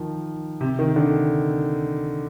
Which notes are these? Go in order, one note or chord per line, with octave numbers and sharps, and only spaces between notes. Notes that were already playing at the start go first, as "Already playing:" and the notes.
Already playing: D#3 F3
C3
D#3
D3